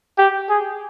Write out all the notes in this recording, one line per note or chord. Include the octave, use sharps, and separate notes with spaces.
G4
G#4